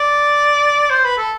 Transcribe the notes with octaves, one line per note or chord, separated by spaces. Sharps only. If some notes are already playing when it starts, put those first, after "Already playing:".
Already playing: D5
C5
B4
A4